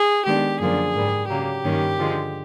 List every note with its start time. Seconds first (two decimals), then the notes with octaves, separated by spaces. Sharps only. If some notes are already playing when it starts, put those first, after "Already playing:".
Already playing: G#4
0.25 D#3 G#3 B3 D4 G4
0.60 F#2 D3 F3 A#3 D4 G#4
0.95 G#2 D#3 G3
1.28 C#3 F#3 A#3 G4
1.62 G2 D#3 G3 A#3 C#4
1.97 D3 F3 G#3